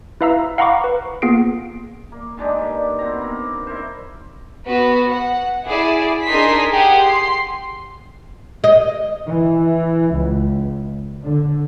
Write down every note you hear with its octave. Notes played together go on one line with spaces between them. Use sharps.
E4 B4 E5 F5 A#5 E6
F5 F#5 A#5 B5 C#6 D6
B4
A#3 B3 F4 G#4 C7 D7
A#3
D#3 G#3 D4 G4
G2
B2 C4 A#5
A#3
E4 A#4 C5
B3 F#4 B4
F#5
E4 G#4 D5
D4 D#4 G#4 A#4 C6 B6
G4 G#4 F#5 G#5
C6
D#5
E3
C#2
D3